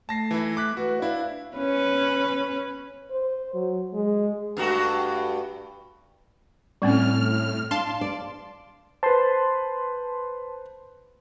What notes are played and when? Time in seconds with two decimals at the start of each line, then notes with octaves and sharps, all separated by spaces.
0.09 A3 A5 A#6 C7
0.31 E3 E4
0.57 D6 F#6 B6
0.77 F#4 B4
1.02 D4 E4 F5
1.57 C#4 B4
3.11 C5
3.54 F#3
3.94 G#3
4.57 G2 A3 F#4
6.82 A2 G3 C4 C#4 F6
7.71 D4 F5 A5 C6
8.01 D5
9.03 B4 C5 A5 C6